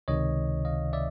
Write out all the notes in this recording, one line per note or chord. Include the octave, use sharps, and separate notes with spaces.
C#2 C3 D#3 C#5 D#5
D#5 F5
D5 E5